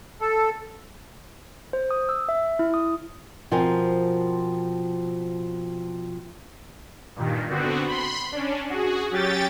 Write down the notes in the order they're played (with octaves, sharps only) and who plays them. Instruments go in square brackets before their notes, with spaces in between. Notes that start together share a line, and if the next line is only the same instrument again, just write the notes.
[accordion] A4
[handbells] C5
D#6
E6
E5
E4
D#6
[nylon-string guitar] B2 F3 C4 A#4 G#5
[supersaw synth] G2 A#2 D#3
D3 B3 C4 F#4
B5 C6
C#4 D4
F#4 G#4
F#3 C#4 G4 G5 A6